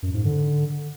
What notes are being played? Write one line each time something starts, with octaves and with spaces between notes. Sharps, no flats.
F#2
G#2
D3